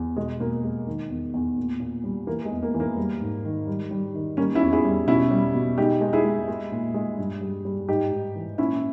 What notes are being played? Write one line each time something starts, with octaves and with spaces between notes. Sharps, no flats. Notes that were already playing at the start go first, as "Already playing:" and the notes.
Already playing: E2
B2 G#3
B2 A#3
G#3
D#3
E2
E2
A#2
A#2
G3
E3 A#3
G#3
E2
A#3
E3
A#3
G3
G#2
D#3
G3
G3
D#3
G3 A#3 C#4
C#4 E4
E2
E4 G#4
G3
B2 C#4 E4
G3
B2
G#3 D#4 G4
G#3
E4 G#4
G#3
G#3
A#2
G#3
G2
G3
G3
G#2 D#4 G4
G#2
E3
A#2 C#4 E4